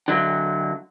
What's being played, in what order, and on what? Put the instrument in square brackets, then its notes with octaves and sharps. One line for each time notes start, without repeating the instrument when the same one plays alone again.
[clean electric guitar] D3 F#3